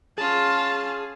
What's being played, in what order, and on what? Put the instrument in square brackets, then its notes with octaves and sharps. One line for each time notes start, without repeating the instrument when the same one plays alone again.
[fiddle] C#4 F4 [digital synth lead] G#4 [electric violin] A5 F6